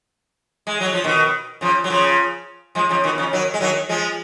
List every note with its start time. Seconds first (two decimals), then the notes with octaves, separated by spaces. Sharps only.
0.67 G#3
0.80 F#3
0.93 F3
1.04 B2 D#3
1.61 C#3 F3
1.84 F#3
1.90 C#3 F3
2.75 F3 G#3
2.89 C#3 F3
3.04 B2 D#3
3.18 C#3 F3
3.33 D#3 F#3
3.54 G#3
3.61 D#3 F#3
3.89 F3 G#3